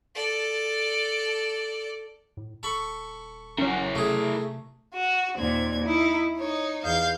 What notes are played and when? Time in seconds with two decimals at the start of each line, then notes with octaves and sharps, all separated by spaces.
0.15 A4 D5
2.37 A2
2.63 D#1 A4 B5 C#6
3.58 F#3 C#4 E4 A#4
3.95 C3 A3 G#4
4.94 F#4
5.37 D#2 A#2 C4 G#6
5.84 D#4 E4
6.37 D#4 C#5
6.84 E2 F5 G6